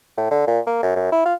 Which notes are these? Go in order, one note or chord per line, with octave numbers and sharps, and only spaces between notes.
A2
D3
A#2
A#3
F#2
F#2
E4
F4